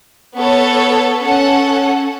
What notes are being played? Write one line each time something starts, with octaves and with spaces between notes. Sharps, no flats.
B3 A4 C#5
C#4 A4 F#5